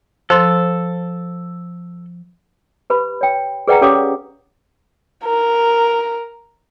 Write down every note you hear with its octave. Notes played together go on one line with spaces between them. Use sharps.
F3 A4 C5 C6
G4 B4 B5
C#5 G5
G#4 B4 D5 F#5 G5 A#5
C#4 G4 A4 C#5 F5 D6
A#4